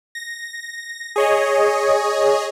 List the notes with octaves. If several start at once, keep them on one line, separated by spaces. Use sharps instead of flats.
A#6
G#4 C#5 D#5